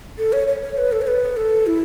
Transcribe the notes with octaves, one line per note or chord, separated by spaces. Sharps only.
A4
C#5
C#5
C#5
B4
A4
C#5
B4
A4
E4